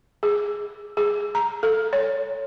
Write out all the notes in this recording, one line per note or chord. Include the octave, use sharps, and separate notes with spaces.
G#4
G#4
A#5
A4
C#5